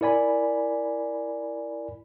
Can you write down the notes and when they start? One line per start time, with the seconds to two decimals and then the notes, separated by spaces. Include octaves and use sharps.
0.01 E4 A#4 D5 G#5 B5